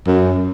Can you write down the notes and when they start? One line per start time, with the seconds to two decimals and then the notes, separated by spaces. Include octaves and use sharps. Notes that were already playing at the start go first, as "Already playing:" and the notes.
0.07 F#2